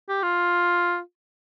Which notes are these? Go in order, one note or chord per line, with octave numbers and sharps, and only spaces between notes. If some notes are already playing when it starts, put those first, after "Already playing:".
G4
F4